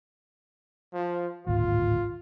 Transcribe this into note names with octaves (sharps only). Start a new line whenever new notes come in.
F3
D1 G#1 A#2 F4